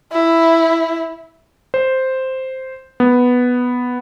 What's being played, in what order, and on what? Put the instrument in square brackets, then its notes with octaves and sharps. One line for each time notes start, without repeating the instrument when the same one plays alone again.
[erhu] E4
[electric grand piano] C5
B3